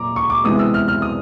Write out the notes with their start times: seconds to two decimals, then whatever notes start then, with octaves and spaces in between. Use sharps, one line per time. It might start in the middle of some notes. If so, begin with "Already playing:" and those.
Already playing: A#2 A#5 D6
0.16 C#6
0.30 D6
0.44 C3 E3 G#3 B3 D#6
0.59 E6
0.74 F6
0.88 F6
1.02 D#6